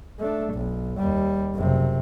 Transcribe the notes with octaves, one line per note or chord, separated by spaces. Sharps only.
A3 D4
B1
D#2 G3
F#1 C3